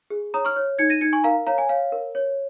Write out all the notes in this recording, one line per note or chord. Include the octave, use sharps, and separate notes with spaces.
G#4
C#5 A#5 D#6
C#6 F6
C#5
D#4 G#6 C#7
A#6 D#7
D#4 G#6 C#7
G#5 C#6
A#4 F5 A#5
C#5 F5 A#5
G#5
C#5 F5
A#4
C#5